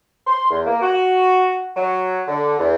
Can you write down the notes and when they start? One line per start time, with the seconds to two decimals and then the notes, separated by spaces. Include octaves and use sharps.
0.27 C6
0.50 E2
0.66 A#3
0.82 F#4
1.76 F#3
2.27 D3
2.58 E2